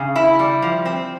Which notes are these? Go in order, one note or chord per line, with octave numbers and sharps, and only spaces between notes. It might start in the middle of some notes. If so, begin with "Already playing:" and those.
Already playing: C#3
E4
G3
F3
C4